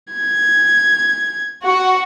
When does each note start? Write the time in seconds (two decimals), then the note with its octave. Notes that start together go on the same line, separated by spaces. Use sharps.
0.13 G#6
1.64 F#4